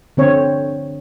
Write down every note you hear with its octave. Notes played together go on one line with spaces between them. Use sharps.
D3 C4 C#5